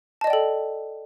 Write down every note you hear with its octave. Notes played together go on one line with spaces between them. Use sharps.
A4 D5 D#5 G5 A5